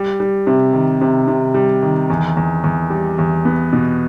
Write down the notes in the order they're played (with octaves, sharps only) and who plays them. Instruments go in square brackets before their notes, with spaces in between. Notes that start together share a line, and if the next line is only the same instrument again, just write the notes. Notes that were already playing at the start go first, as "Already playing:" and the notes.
Already playing: [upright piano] G3
G3
C3
D#3
C3
C3
G3
D#3
E2
E2
E2
G3
E2
B3
B2